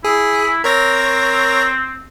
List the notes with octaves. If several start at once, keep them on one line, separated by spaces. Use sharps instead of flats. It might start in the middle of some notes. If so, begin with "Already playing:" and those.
E4 G#4
C4 A#4 C#5 A#6